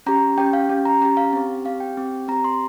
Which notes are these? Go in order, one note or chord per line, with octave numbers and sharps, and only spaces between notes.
C#4 G4 A#5
C#4 G4 G5
F5
C#4 G4
A#5
C#4 G4 A#5
F5
C4 G4
C4 G4 F5
G5
C4 G4
C4 G4 A#5
C6